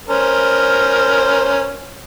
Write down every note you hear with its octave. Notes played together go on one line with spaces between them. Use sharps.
C#4 A#4 C5